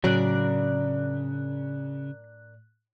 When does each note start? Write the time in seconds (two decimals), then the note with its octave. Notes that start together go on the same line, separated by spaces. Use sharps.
0.04 A2 C#3 F#3 D4 A#4 D5 F#6